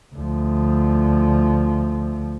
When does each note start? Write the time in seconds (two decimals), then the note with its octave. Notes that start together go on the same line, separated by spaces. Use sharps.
0.15 D2 F3